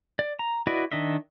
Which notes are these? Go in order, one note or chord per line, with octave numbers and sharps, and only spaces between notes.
D5
A#5
E4 F#4 B4 D5 D#5
D#3 D4 D#5 E5